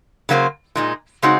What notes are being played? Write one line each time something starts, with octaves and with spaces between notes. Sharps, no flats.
C#3 F#3 A#3 F4 C5
A#2 G#3 D#4
C#3 G#3 C4 D#4 F#4